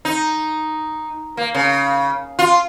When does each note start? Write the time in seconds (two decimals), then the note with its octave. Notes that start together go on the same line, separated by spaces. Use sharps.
0.05 D#4
1.37 A#3
1.54 C#3
2.39 F4